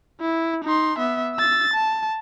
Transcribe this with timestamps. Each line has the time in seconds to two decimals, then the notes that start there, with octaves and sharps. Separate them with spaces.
0.21 E4
0.64 D#4 C6
0.98 B3 E5
1.35 E6 A6
1.74 A5